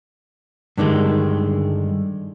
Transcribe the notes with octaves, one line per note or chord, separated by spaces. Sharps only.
G2 D3 D#3 G#3